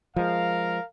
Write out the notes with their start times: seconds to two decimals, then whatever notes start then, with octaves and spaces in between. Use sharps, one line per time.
0.16 F3 G#3 A#4 F5